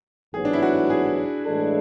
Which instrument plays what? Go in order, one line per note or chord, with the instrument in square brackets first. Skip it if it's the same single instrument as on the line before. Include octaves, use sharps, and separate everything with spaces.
[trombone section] A1 G#2 F#3 B3 [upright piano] G#4
[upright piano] D4
E4
F#4
G#4
[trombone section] A2 E3 G#3 D4 A4